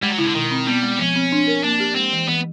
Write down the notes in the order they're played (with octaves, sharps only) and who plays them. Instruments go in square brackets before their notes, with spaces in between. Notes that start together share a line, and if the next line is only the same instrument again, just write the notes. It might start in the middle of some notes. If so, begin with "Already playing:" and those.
[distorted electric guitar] G3 [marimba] G#3
[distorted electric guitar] F#3
[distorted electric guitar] C#3 [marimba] E4
[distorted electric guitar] D3
[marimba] B2 [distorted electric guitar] D#3
[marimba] C4
[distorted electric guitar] G3 [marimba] B3
[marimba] G#3
[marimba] F3 [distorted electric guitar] C#4
[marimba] C4
D4
A#4
[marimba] A#3 [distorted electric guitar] D4
[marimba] G4
[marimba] G#3 [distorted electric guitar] C4
[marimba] E3
[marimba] E3 [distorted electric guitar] B3